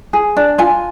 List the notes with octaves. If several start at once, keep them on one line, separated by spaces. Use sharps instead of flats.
G#4
D4
F4 G#5